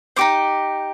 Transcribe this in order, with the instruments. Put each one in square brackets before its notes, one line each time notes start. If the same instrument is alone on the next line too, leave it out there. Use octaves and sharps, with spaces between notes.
[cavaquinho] D#4 G4 C5 D6